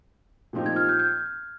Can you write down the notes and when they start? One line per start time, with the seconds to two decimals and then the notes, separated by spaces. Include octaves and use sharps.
0.53 A#2 F3 C4 D#4 G4
0.66 G#6
0.76 F6
0.89 G6
0.99 G6